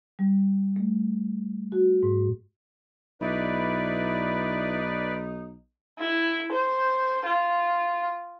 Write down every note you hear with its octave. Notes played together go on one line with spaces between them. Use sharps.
G3
A3
F#4
G#2
B1 D#4 E4 B4 D5
E4
C5
F4